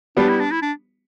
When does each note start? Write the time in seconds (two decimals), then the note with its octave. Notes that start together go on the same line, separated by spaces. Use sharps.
0.17 G3 B3 D4
0.28 E4
0.40 D4
0.51 E4
0.62 D4